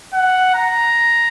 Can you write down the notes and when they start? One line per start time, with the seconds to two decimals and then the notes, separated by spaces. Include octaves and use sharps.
0.13 F#5
0.55 A#5